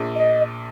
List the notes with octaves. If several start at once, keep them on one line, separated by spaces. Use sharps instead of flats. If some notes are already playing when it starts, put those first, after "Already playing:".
Already playing: A#1 A#2
D#5